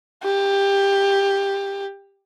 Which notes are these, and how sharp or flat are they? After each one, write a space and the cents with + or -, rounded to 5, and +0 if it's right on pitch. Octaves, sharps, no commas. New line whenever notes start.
G4 +15